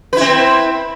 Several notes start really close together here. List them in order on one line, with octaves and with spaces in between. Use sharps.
B4 E4 C4